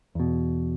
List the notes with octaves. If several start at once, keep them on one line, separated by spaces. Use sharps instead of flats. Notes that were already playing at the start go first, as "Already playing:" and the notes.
E2 B2